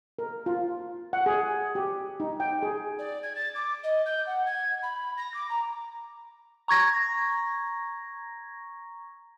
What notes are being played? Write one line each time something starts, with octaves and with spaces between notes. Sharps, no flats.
A#4
F4
F#5
G#4
G4
D#4
G5
G#4
D5
G#6
A6
D6
D#5
G6
F#5
G#6
B5
A#6
D6
A#5
A#5 C#6 G#6 A#6